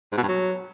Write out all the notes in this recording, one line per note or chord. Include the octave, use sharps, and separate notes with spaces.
G#2
B2
G2
F#3